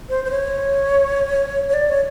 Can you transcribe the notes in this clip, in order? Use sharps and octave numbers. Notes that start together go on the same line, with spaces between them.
C5
C5
C#5
C#5
D5
C#5